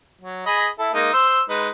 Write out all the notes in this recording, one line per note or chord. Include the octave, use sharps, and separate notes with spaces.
F#3
G#4 D#5 B5
E4 A4
G#3 A#3 D#4
C5 E6
G#3 D#4 B4